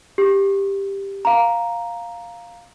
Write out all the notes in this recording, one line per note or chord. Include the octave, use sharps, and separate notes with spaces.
G4
F5 A#5